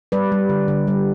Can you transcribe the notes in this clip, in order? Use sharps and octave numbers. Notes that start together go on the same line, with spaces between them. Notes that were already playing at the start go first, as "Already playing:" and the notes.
G3 B4 D5
G3
D3
D3
G3